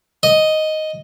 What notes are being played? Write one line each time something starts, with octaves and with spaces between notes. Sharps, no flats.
D#5